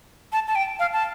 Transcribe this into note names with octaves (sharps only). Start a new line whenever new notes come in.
A5
A5
G5
F5
A5